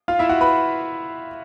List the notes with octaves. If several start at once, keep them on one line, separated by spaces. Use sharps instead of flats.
F4 F5
E4 E5
F#4 F#5
B4 B5